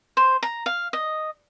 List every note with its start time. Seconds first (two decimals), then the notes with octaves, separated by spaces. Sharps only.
0.17 C5
0.43 A#5
0.66 F5
0.93 D#5